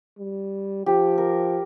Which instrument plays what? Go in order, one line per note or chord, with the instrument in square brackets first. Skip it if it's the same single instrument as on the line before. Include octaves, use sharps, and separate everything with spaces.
[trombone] G3
[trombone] F3 [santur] G4
[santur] A#4